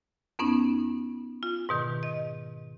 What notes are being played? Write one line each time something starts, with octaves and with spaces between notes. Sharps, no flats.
F2 B3 C#4 D#4
F4
G#2 B2 D#3
D#5